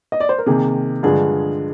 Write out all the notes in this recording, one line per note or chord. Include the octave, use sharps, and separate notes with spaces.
D#5
D5
C5
A#4
C3 D#3 A#3 G#4
G2 D3 F3 G#3 G#4